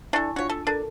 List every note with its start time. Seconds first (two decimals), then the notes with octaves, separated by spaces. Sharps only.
0.13 D4 E4 A4 G#5 C#6
0.36 D4 F4 F#4 C#5
0.49 A4
0.67 D4 A4 A#4